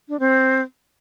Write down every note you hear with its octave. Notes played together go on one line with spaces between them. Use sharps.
D4
C4